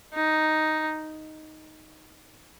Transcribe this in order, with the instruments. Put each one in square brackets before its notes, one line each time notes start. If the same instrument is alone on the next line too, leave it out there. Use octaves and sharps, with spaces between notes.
[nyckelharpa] D#4